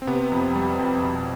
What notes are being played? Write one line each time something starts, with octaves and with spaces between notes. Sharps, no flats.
C4
C3 B3
F2
G3
F2
B2